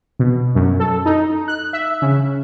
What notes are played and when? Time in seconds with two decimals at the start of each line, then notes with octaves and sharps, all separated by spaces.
0.19 B2
0.55 F#2
0.80 A4
1.06 D#4
1.48 F#6
1.73 E5
2.02 C#3